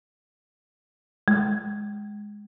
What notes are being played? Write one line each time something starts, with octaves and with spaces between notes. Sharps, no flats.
G#3